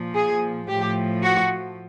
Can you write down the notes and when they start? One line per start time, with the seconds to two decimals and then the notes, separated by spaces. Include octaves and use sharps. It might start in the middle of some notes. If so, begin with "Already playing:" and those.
Already playing: A#2 F3
0.15 G#4
0.69 A2 F3 G4
1.23 F#4